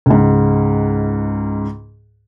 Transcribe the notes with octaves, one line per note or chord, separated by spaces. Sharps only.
C#2 G#2